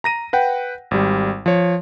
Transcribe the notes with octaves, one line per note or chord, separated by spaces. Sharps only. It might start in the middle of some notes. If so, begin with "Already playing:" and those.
A#5 A#6 D#7
B4 F#5 G5
G#1 G3
F3 C#5